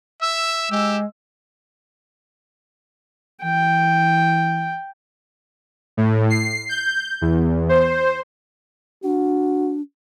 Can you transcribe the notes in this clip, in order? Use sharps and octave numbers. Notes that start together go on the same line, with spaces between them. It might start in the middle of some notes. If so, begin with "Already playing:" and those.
E5 E6
G#3 G4
E3 G5
A2
C7
G6
E2
C5
D4 F#4